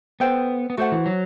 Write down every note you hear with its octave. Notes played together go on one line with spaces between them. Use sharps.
B3 A4 C5 G5
B3
A3 F#4 C5 F#5
E3
F#3